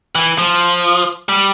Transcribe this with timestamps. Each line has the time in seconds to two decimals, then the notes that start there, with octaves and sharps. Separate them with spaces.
0.15 E3
0.38 F3
1.29 G3